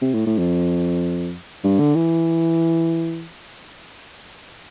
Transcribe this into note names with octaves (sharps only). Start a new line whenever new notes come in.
C3
A2
A2
F2
G2
D3
E3